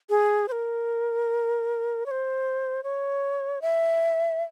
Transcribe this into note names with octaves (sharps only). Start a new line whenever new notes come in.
G#4
C5
A#4
C#5
C5
C#5
E5